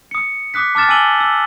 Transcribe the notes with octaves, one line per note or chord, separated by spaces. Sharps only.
D#6 C#7
D6 D#6 F#6 B6
A5 D6 F6 A6 E7
G#5 E6 D#7 F#7 G7
E6